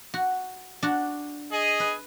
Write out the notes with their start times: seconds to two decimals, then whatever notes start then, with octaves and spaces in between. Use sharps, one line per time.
0.14 F#4
0.83 D4 F#4
1.52 G#4 D#5
1.80 B4